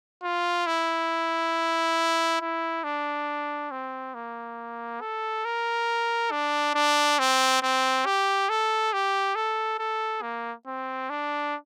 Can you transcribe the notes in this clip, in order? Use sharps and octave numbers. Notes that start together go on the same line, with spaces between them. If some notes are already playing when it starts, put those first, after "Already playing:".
F4
E4
E4
D4
C4
A#3
A4
A#4
D4
D4
C4
C4
G4
A4
G4
A4
A4
A#3
C4
D4